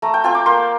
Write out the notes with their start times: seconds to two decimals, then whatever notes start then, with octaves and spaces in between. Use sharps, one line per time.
0.02 A3 A#5
0.14 G5
0.24 C4 F4 G5
0.35 D6
0.46 A#3 C6